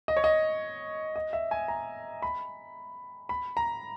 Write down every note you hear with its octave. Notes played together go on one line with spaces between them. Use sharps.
D#5
C#5
D#5
D#5
E5
G#5
A#5
B5
B5
A#5